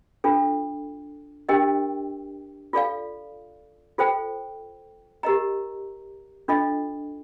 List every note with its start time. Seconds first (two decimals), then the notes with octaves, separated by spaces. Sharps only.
0.24 D4 F4 A4
1.49 D4 G4 A#4 D#5 G5
2.73 F4 A4 D5 F5
3.98 F4 A4 C5 G5
5.23 G4 A#4 D#5 A#5
6.48 D4 F4 A4 D#5